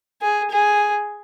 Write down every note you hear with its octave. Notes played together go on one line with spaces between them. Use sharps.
G#4
G#4